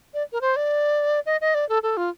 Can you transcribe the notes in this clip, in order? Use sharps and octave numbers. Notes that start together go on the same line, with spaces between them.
D5
A#4
C5
D5
D#5
D#5
D5
A4
A4
F4